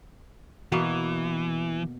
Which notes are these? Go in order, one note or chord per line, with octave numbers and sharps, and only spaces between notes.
B2 E3 A#3 B3